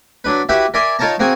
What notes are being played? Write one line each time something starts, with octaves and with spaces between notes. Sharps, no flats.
F#3 D4 B4
E4 F#4 G4 B4 E5
A#4 D5 E5 G#5 C6
D#4 F4 A#4 C#5 A5 A#5
A#3 C4 F#4 G#4 G#5